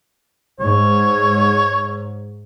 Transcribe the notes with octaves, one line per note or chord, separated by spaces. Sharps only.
G#2 C#5